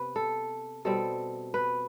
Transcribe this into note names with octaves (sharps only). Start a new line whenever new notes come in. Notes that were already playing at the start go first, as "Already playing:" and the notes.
Already playing: C3 B3 B4
A4
B2 G3 C4 A4
B4